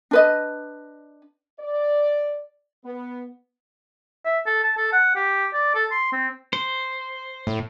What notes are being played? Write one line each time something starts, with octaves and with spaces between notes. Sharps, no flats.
D4 B4 D#5
D5
B3
E5
A4
A5
A4
F#5
G4
D5
A4
C6
C4
C5
A2